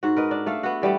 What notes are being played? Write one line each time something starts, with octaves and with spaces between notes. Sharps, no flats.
G#2 F#4
A#4 B4 D#5
D4
A3 A4 F5
B3 F#4
E3 G3 A3 B3